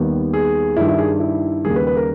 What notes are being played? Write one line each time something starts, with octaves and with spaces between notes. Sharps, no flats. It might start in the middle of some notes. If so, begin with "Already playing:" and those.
Already playing: D#2 D#3 G3 B3
G#4
G2 D#3 G3 E4
E4
G#4
E4
D#2 C#3 G3 A#3 G#4
B4
B4
A#4